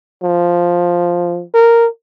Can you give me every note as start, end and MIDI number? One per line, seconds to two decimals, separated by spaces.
0.23 1.43 53
1.54 1.87 70